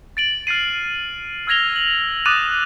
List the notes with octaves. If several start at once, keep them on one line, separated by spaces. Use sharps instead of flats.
A6 D7 F#7
F6 A6 C7 D#7
E6 F6 G#6 A#6 F7 G7
F#7
D6 D#6 F#6 A6 D#7 E7